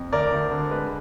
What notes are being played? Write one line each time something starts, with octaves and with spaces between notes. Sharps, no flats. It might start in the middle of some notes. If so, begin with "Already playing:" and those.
Already playing: F2
D2 A#4 D5
D2
D3
G#3 B4